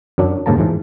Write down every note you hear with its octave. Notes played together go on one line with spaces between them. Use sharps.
F#2 F#3 D4
D#2 G#2 C#3 A#3 A5 A#5
G#2 E3 F3